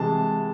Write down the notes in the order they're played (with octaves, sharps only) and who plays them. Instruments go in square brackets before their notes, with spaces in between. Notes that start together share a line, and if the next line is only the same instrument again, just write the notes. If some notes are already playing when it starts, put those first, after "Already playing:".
Already playing: [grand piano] C3 E3 G#3 A5